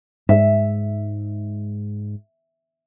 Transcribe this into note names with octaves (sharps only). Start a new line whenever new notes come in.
G#2 E5